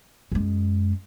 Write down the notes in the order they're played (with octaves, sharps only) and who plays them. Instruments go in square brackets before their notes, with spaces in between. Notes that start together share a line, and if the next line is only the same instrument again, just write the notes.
[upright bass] F#2 G#3